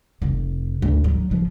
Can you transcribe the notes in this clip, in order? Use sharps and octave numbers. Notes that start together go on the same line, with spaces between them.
F1
D2
F#3
F3